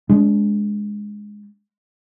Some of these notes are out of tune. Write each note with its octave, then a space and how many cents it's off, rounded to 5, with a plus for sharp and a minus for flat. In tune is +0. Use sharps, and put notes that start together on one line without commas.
G#3 +0 D4 -35